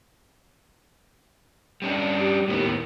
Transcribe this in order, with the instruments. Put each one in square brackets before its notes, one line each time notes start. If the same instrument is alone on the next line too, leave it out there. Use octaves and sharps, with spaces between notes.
[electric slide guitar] G3 C#4 D4
[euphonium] G4
[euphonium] D#2 [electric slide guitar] A2 B3